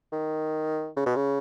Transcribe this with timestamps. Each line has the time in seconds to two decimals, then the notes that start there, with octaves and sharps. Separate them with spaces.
0.12 D#3
0.97 C#3
1.06 B2
1.15 C#3